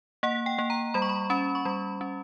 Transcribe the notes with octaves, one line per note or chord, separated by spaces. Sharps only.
A#3 F#5
G5
A#3
A#5
G3 B5
C#6
B5
C#4 B5
C#6
G3 B5
C#4